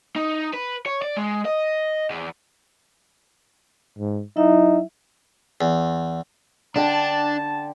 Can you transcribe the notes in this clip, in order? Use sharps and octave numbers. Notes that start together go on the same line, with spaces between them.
D#4
B4
C#5
D5
G#3
D#5
E2
G#2
F#3 D#4 E4 E5
E2
D3 D4 G5 A5